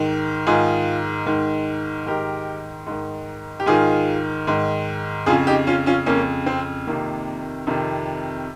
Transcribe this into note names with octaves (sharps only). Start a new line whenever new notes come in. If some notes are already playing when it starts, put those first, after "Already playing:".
Already playing: G#2 D#3
G#2 D#3 F4 G#4
G#2 D#3
G#2 D#3 G4 A#4
G#2 D#3
G4
G#2 D#3 F4 G#4
G#2 D#3
F2 C#3 F4 G#4
D#4 G4
C#4 F4
C#4 F4
F2 C#3 A#3 C#4
C4
F2 C3 D#3 A#3
F2 C3 D#3